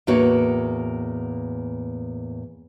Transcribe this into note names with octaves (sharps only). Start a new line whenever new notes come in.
E2 A2 A#3 F#4 C#5